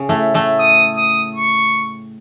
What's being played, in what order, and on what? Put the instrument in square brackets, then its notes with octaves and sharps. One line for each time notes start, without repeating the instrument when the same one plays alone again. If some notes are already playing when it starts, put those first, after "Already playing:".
Already playing: [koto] C#3
A2 A3
A2 A3
[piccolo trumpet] D#6
D#6
C#6